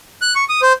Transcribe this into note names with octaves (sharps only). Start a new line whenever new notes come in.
F#6
C#6
D#6
C5